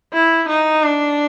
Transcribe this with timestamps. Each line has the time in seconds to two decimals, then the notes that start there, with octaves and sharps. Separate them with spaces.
0.13 E4
0.49 D#4
0.83 D4